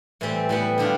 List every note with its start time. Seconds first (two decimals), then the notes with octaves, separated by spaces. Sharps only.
0.21 A2 E3 G3 C4
0.49 A2 G3 B3
0.78 D3 G3 D4 F4